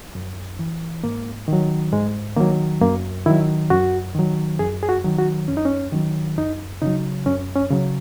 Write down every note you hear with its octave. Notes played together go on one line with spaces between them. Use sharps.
F#2
E3
G#2 A#3
D#3 F#3
G#2 G#3
D#3 F#3 A#3
F#2 A#3
D#3 F#3 E4
F#2 F#4
D#3 F#3
F#2 G#4
G#4
F#4
D#3 F#3
F#4
F#2 C#4
D#4
C#4
D#3 F#3
F#2 D#4
C#3 F#3 D#4
F#2 C#4
C#4
C#3 F#3